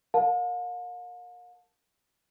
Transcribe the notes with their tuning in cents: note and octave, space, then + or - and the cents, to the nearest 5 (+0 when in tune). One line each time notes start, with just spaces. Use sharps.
A#4 +5 F5 +45 A5 +0